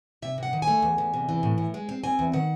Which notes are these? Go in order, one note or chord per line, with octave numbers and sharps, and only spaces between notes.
C3 E5
C3 F#5
D#3
G#5
A3
E2
E2
C3
E3
A2
A2
G#3
C4
C4 G#5
E2
D#3 F#5